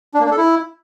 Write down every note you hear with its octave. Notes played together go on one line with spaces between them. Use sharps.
D4
A#3
D4
A4
E4